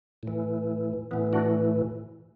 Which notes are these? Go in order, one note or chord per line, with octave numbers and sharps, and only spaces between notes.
A2 E3
A2 E3 B3
D4 F#4